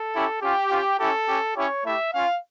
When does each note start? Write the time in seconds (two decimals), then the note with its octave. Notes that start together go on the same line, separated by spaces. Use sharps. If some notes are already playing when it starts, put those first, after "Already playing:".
Already playing: A4
0.15 C#4 E4 G4
0.42 C#4 F4 G4
0.71 C#4 F4
1.00 C#4 E4 G4 A4
1.28 C#4 G4
1.56 C#4 E4 G4 C#5
1.85 A3 E4 G4 E5
2.13 C#4 F4 F5